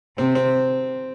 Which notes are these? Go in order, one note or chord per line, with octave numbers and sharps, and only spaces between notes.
C3 C4
C4